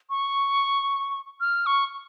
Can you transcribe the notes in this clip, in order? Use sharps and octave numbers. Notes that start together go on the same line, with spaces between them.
C#6
F6
C#6